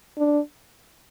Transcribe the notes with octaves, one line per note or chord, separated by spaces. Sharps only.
D4